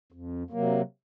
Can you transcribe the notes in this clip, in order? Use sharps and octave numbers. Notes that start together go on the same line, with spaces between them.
F2
C3 F#3 A#3